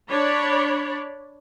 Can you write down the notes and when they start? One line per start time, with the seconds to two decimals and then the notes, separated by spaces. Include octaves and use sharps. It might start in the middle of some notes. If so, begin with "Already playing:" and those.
0.10 D4 C#5 D5 B5